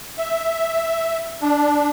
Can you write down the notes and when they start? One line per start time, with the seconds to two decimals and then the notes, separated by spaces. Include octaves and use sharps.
0.18 E5
1.41 D4